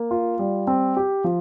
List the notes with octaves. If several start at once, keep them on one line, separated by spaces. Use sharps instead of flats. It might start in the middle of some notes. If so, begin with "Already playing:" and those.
Already playing: A#3
F4
G3
C4
G4
F3